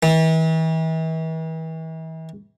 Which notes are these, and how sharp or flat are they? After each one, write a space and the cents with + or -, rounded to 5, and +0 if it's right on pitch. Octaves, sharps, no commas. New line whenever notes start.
E3 -40